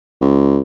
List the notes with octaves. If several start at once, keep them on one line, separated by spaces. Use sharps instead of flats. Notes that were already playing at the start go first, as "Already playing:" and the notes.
C#2